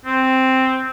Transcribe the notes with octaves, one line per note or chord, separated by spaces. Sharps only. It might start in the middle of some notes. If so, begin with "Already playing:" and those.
C4